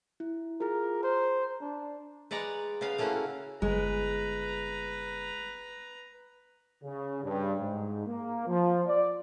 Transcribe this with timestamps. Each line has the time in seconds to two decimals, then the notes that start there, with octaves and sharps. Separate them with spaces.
0.20 E4
0.61 F4 G#4 A#4
1.03 C5 A#5
1.61 D4
2.31 G#3 B4 D5 F#5 A#5
2.81 C#3 B3 B4 F5
2.98 A3 A#3 C#4 E4 F#4
3.62 G1 G#3 B4 A#5
6.84 C#3
7.24 G2
7.60 G#2
8.07 A#3
8.47 F3
8.87 D5